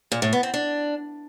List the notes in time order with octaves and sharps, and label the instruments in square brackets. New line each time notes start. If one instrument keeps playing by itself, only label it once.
[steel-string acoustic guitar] A#2
A2
B3
C4
D4